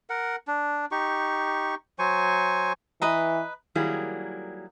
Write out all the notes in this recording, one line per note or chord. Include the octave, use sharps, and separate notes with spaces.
A#4 F#5
D4
D#4 G4 C#6
F#3 C5 G#5 C#6
E3 B4 D#5 A#5
D#3 F#3 G3 A#3 E4 G#4